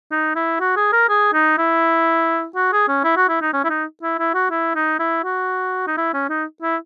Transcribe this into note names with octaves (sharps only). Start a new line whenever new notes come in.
D#4
E4
F#4
G#4
A#4
G#4
D#4
E4
F#4
G#4
C#4
E4
F#4
E4
D#4
C#4
E4
D#4
E4
E4
F#4
E4
D#4
E4
F#4
D#4
E4
C#4
D#4
E4